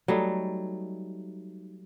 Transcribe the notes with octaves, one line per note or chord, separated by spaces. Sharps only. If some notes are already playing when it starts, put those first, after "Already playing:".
F#3 G3 A3 D#4